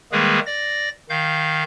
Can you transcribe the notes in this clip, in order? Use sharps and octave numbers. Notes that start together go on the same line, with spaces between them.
D#3 G3 G#3 A#3 G#4 B4
D5 A#6
D#3 F5 G6